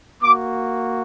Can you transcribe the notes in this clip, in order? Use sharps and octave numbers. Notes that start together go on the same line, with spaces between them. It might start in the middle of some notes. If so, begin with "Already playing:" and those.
A#3 F#4 D6